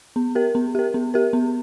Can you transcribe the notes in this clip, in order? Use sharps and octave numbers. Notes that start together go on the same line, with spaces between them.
B3
G4 A#4
B3
G4 A#4
B3
G4 A#4
B3